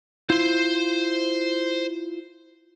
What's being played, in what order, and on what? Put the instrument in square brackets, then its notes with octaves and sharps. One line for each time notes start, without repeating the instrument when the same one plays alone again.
[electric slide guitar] E4 F4 [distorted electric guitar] C5 C6